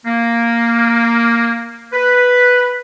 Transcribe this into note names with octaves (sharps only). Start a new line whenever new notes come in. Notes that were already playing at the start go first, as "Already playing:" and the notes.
A#3
B4